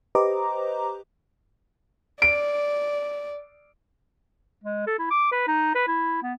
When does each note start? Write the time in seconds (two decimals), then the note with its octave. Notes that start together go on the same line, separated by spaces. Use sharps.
0.15 G4 B4 C5 D#5 A#5 D6
2.22 D5 D7
4.64 G#3
4.87 A4
4.99 E4
5.11 D6
5.32 B4
5.48 D#4
5.75 B4
5.87 E4
6.22 B3